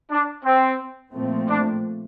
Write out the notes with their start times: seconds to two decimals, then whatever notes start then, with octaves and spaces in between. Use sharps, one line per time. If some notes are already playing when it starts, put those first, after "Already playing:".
0.11 D4
0.45 C4
1.14 A#2 F3 A3 C4
1.49 D4